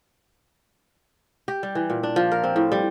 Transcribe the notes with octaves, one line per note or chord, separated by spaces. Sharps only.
G4
G3
E3
A#2
D4
F3
A#4
C4
A2
G3